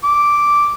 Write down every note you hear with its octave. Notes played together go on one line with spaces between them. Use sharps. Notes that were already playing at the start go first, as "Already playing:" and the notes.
D6